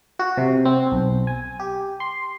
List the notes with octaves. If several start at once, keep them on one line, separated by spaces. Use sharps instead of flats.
F#4
C3
C4
B1
G#5
G4
C6